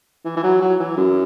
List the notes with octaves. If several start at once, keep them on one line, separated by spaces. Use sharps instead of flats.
E3
E3
F#3
F#3
E3
F#2